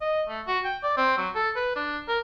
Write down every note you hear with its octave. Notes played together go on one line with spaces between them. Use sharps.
D#5
A3
F#4
G5
D5
C4
F#3
A4
B4
D4
A#4